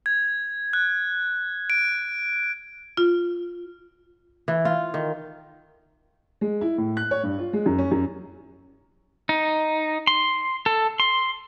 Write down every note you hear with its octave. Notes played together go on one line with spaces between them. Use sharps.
G#6
F#6
D7
F4
E3
F4
D#3
G#3
E4
A2
F#6
C#5
G2
F4
G#3
F#2
C#4
F#2
D#4
C6
A4
C6